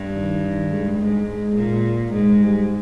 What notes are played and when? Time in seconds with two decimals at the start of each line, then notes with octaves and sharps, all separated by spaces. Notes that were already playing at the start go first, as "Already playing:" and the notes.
Already playing: G2
0.15 D#3
0.44 D#3
0.71 G#3
0.99 G#2
1.56 A#2
2.12 G#2 G#3
2.40 G3